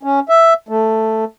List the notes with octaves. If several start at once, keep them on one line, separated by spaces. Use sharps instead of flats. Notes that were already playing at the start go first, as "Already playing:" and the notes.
C#4
E5
A3